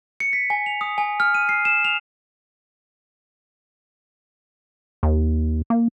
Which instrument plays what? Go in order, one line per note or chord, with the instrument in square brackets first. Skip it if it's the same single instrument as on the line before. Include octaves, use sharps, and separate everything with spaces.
[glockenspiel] C#7
B6
G#5
F7
D#6
G#5
F6
D#7
C7
E7
F7
[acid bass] D#2
A#3